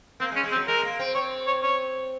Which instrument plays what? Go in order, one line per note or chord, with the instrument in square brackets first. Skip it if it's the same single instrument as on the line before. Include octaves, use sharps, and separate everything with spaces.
[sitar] A#3 [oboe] C4
[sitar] G#3
[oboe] C#4
[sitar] G#3
[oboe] C4
[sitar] F#3
[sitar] G#3 [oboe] A#4
[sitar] A#3
C4
[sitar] C4 [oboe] C#5
[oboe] C#5
C#5